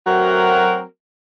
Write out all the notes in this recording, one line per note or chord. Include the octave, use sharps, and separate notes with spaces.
F#3 A3 C4 F#4 A#4